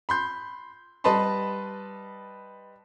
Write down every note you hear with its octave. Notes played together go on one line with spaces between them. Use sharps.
B5 C6 G6
G3 B4 D#5 A5 B5 C6